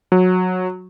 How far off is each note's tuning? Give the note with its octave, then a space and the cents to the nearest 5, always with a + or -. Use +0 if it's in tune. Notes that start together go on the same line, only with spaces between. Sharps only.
F#3 -15